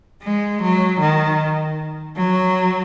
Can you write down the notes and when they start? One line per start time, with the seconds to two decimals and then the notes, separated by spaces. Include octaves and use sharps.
0.23 G#3
0.62 F#3
1.00 D#3
2.16 F#3